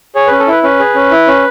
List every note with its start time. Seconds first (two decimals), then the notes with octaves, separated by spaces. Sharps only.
0.15 G#4 C#5
0.27 C#4 B4
0.40 A4
0.48 E4 B4
0.63 C#4 B4
0.79 G#4
0.95 C#4
1.11 E4
1.27 C#4